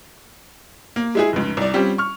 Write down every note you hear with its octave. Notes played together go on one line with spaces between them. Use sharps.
A#3
G#3 E4 G#4
F1 C#2
C2 D5
G3 C4 C#4 F4 G4
C#6 F6